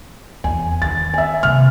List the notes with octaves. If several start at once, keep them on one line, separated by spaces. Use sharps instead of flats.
E2 G#5
D#3 A6
E5 G#5
C3 A#3 F6